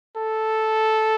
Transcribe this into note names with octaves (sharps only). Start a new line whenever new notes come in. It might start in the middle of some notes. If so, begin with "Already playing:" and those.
A4